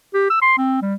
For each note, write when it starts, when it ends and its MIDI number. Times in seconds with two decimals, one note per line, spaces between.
0.14 0.27 67
0.30 0.39 88
0.42 0.53 84
0.58 0.78 60
0.82 0.95 55